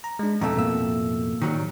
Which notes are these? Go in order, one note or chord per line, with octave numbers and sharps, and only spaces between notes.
A#5
G#3 D4
F2 B2 A3 A#5 E6
A2 A#3 E6
D#3 F#3 G3